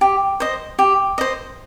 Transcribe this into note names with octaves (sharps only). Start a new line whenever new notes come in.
G4
C5 D#5
G4
C5 D#5